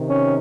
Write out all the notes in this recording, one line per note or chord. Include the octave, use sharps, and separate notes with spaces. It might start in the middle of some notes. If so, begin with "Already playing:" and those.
Already playing: C3 D#3
C#4